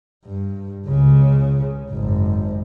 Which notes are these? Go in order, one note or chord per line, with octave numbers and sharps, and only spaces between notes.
G2
C#2 C#3
G#1 F#2